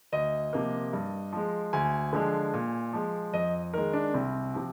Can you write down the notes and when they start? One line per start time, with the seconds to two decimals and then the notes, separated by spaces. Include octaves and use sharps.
0.12 D2 D#5
0.53 C3 F3 A#3
0.93 G2
1.32 F3 G#3
1.73 D2 G#5
2.13 D3 F3 G#3
2.54 A#2
2.93 F3 G#3
3.33 F2 D#5
3.74 D#3 G#3 A#4
3.93 D4
4.14 C2 C4
4.54 C3 F3